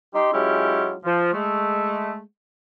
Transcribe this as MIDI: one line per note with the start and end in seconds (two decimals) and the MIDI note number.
0.15 0.30 63
0.15 0.30 67
0.15 0.30 84
0.33 0.95 54
0.33 0.95 56
0.33 0.95 61
0.33 0.95 64
0.33 0.95 65
0.33 0.95 67
1.05 1.32 53
1.33 2.21 56
1.33 2.21 57